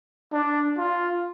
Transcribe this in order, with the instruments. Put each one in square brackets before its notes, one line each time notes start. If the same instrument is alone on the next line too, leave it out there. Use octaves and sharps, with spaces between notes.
[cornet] D4
F4